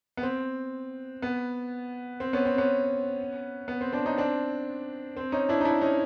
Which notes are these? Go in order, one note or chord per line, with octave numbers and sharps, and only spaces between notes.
B3
C4
B3
C4
B3 C#4
C4
B3 C#4
B3
C4
C4 D4
C#4 D#4
C4 D4
C4
C#4 D#4
D4 E4
D#4
D4 E4
C#4 D#4